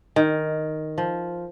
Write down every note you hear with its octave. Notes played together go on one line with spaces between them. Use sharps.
D#3
F3